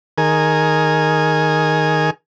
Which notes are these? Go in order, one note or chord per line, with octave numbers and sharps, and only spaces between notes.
D#3 G#4 A#4 G#5